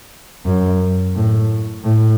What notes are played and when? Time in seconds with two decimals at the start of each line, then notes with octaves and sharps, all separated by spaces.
0.46 F#2
1.15 A2
1.84 A2